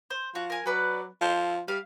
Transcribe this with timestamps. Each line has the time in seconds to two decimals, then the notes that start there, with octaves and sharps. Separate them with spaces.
0.10 C5
0.35 F3 F#4
0.50 A#4 G#5
0.66 F#3 F#4 B4 D5
1.22 F3 A4 C5
1.68 G3 E5 F5